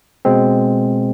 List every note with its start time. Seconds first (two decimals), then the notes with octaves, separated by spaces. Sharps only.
0.25 B2 G#3 C4